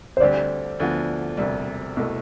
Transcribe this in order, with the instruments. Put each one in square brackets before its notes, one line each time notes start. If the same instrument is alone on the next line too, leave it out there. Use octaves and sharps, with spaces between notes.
[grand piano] C5
[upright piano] D2 D3 G3 C4 G4 [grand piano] D5
[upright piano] D2 D3 F3 B3
E1 D2 C3 G3
C2 B2 A3 E4